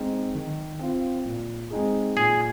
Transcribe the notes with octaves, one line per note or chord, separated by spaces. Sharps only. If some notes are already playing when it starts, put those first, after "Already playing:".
Already playing: G#3 C4 D#4
D#3
C4 F4
A#2
G#3 C4 D#4 G#4
A#2 G#4